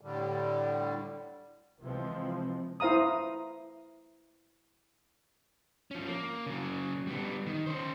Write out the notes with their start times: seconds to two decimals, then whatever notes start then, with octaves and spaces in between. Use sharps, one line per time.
0.01 A2 D3 G3
1.82 C3 E3 F3 G#3 C4
2.80 E4 C5 F5 A#5 D#6
5.91 F3 C#4
6.07 A#3
6.46 C#3 F#3
7.07 G3 B3
7.46 D#3
7.66 C#4 C5